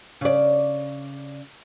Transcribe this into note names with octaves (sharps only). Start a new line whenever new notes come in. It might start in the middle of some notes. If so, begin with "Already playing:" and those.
C#3 D5